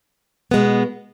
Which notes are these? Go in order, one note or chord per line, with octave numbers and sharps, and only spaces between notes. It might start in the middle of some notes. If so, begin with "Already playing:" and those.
B2 G#3 B3